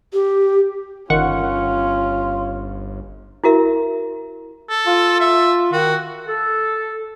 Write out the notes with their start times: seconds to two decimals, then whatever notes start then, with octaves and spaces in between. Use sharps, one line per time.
0.13 G4
1.10 G1 D#3 C#4 F4 F#5 C#6
3.44 E4 F#4 A#4 E5
4.69 A4
4.87 F4
5.21 E5
5.73 D#3 F#4
6.28 A4